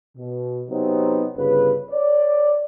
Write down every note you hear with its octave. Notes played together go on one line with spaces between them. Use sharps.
B2
C3 F#3 B3 C4 D#4
G1 C#3 B4
C#5 D5